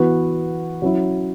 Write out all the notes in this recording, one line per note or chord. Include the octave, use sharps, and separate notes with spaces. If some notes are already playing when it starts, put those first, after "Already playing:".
Already playing: E3 B3 F#4 B4
F#3 C#4 E4